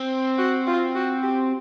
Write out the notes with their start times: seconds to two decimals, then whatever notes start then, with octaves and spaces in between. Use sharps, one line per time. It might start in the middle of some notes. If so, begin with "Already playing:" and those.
Already playing: C4
0.38 F#4
0.67 F4
0.95 F#4
1.23 G4